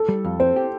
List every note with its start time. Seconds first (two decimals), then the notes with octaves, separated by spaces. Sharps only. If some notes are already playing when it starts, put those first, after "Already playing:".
Already playing: A4
0.09 G3
0.24 F2
0.40 C4 C5
0.56 G4